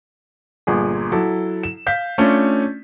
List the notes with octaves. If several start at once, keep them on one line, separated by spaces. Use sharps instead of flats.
G1 A#2 G#4
F#3 E4 A4
E7
F5 G6 B6
A3 C#4 D4 F4